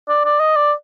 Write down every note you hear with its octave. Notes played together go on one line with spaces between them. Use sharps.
D5
D5
D#5
D5